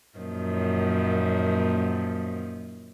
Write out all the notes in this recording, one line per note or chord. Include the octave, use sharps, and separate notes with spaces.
F#2 A#2 D#3 F3